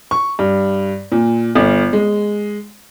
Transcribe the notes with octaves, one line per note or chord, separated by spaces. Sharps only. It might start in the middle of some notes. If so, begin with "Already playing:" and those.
C#6
G2
A#2
G1
G#3